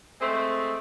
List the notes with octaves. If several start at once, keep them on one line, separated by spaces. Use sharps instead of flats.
G#3 A3 C4